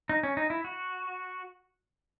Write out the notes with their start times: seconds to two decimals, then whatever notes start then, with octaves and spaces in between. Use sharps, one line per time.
0.09 D#4
0.23 C#4
0.37 D#4
0.50 E4
0.65 F#4